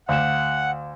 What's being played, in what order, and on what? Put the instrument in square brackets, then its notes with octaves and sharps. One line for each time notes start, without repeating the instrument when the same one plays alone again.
[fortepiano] D2 [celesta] F5 E7 [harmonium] F#5